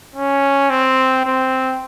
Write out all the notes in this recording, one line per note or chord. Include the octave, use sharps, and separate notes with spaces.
C#4
C4
C4